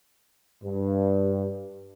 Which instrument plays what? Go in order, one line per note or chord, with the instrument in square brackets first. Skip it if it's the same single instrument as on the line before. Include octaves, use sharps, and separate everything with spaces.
[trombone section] G2